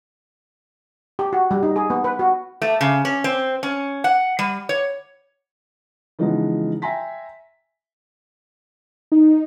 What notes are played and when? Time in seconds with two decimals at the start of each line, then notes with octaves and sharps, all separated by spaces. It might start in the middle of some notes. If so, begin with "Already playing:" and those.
1.19 G4
1.33 F#4
1.51 G3
1.63 D#4
1.76 G#4
1.90 B3
2.04 B4
2.19 F#4
2.62 A3
2.81 C#3
3.05 C#4
3.24 C4
3.63 C#4
4.04 F#5
4.39 G3
4.69 C#5
6.19 C#3 E3 F3 G#3 B3 D#4
6.82 E5 G5 G#5 A#5 C6 B6
9.12 D#4